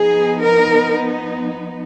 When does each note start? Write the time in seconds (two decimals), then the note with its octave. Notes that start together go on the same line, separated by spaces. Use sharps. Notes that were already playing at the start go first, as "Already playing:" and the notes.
Already playing: F3 B3 D#4 G#4
0.43 A#4